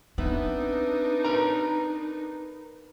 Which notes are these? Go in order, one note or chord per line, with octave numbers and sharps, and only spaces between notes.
B3 C4 D4 D#4 B4 E5
A#4 B4 A#5